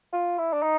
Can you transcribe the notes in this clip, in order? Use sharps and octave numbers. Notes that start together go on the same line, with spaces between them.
F4
E4
D4
D#4